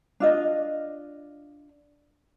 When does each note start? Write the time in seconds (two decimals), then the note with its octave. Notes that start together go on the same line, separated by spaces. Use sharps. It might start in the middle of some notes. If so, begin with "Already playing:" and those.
0.20 D4 F4 D#5